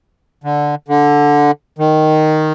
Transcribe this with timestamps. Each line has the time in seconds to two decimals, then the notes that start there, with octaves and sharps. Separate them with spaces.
0.44 D3
0.88 D3
1.78 D#3